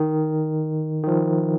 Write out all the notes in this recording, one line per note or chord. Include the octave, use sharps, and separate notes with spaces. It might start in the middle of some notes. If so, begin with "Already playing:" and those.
Already playing: D#3
D#3
F3